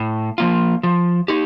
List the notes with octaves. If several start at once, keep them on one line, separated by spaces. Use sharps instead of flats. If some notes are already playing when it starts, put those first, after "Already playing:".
Already playing: A2
F3 A#3 F4
F3
D#4 G4